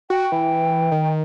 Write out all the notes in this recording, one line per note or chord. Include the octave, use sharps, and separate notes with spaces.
F#4 G5
E3
D#3